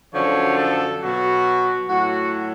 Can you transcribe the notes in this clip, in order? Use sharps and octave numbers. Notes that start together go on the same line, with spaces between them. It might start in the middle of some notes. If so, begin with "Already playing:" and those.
F#2 D3 F3 C#5
A4
B2 F#3 F#4
A2 F#3 F#4